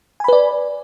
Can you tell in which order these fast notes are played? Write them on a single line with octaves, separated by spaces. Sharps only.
G#5 B5 B4 D5